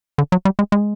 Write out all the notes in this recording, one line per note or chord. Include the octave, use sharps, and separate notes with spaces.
D3
F#3
G3
G#3
G#3